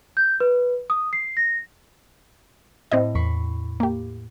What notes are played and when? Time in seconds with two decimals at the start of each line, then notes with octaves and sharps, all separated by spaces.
0.17 G6
0.40 B4
0.90 D#6
1.13 C7
1.37 A#6
2.92 A2 C4 E4 D#5
3.15 E2 B5 C#6 C7
3.80 A#3 G4